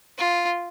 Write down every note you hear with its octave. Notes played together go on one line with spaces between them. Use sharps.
F4